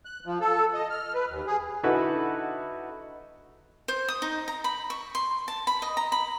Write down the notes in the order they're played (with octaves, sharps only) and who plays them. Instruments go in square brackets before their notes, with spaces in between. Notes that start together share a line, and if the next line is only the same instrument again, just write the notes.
[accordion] F#6
F3
A4
D#5
F6
B4
D#2
G#4
[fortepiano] D3 D#4 E4 F#4 A4 B4
[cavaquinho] C5
D#6
D#4
A#5
B5
C#6
C6
A5
B5
D#5
A#5
B5